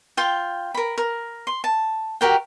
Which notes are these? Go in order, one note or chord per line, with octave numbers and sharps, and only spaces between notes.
F4 G5
A#4 B5
A#4
C6
A5
F#4 G4 A#4 G5